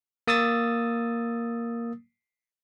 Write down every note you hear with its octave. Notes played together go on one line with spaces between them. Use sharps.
A#3 D#6 E6 A6